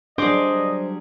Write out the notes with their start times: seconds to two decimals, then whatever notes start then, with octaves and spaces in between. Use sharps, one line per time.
0.18 F#3 G3 D4 G#4 C5 D#5 D6